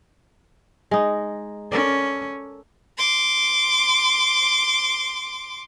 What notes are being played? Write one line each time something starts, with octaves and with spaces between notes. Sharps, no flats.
G#3 D#4
C#4 A4 A#4 D5
C6 D6